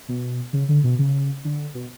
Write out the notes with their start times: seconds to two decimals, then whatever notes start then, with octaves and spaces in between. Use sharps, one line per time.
0.09 B2
0.53 C#3
0.69 D3
0.84 B2
0.99 C#3
1.45 D3
1.75 B2